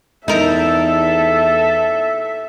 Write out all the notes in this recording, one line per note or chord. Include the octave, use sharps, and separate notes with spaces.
E2 D#4 A4 A#4 E5